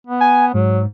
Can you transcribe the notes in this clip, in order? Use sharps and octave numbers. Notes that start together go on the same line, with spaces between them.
B3
G#5
G#2 F#3